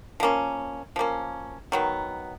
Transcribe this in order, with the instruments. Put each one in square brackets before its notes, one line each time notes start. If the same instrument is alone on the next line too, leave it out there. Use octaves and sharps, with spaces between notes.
[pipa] F3 A#3 C#4
F3 A#3 C#4
D#3 F#3 B3